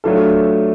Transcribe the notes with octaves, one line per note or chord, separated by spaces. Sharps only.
F#3 A3 D4 F4 A4